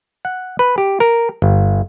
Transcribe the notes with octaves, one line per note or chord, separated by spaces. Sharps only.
F#5
B4
G4
A#4
G1